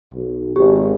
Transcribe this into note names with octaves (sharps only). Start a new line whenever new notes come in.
B1
G#1 G4